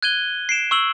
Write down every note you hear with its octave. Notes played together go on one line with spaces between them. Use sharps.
F#6 G#6 D#7 G7
C7 D7 E7
C#6 E6 F#7